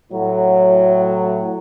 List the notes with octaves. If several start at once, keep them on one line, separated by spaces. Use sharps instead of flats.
A2 F#3